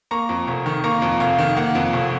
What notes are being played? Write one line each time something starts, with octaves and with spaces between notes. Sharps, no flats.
A#3 A#5 C#6
F2
F1
D#3
A#3 A#5 C#6
F2
F1 F5
D#3
A#3 F#5
F2
F1